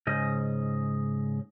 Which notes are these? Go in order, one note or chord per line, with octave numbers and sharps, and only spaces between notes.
G#2 C#3 D#5